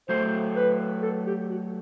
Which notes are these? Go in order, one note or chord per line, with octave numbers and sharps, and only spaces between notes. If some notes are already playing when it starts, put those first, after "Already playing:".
F#3 A3 C5
B4
A4
G4
F#4